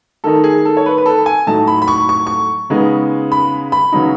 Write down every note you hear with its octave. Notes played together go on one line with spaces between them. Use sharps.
D#3 A3 D#4 A4
G#4
A4
C#5
B4
B4
A4
G#5
A2 F#3 A3 D#4 A5
B5
B5
C#6
C#6
C#6
C#3 G#3 B3 D#4
B5
B5
C#3 F#3 B3 D#4